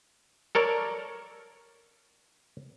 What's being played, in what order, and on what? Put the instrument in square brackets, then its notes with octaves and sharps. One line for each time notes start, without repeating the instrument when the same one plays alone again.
[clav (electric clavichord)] A4 A#4 C#5 D5